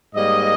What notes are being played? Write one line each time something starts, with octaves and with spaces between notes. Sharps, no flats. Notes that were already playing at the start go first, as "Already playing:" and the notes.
G#2 G3 A#3 D#5